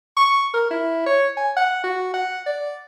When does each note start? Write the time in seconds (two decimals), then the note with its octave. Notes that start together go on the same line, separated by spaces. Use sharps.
0.17 C#6
0.54 A#4
0.71 E4
1.06 C#5
1.37 G#5
1.57 F#5
1.84 F#4
2.14 F#5
2.46 D5